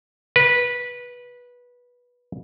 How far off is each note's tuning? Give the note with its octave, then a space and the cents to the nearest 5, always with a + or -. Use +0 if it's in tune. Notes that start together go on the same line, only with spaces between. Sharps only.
B4 -15